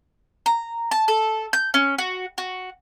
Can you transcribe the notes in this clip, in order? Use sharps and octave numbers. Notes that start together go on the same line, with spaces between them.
A#5
A5
A4
G6
C#4
F#4
F#4